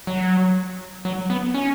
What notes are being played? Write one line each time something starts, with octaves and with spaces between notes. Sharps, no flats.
F#3
F#3
B3
C#4